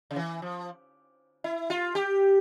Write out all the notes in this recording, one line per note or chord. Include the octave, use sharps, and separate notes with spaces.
C#3
E3
F3
E4
F4
G4